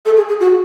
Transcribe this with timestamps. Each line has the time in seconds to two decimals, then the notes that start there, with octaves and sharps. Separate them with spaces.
0.05 A4
0.17 G#4
0.28 G#4
0.40 F#4